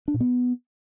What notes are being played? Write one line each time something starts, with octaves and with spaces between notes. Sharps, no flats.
D4
A#2
B3